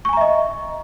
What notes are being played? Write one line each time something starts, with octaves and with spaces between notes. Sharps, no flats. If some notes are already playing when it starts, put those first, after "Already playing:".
D#5 E5 G#5 A#5 C#6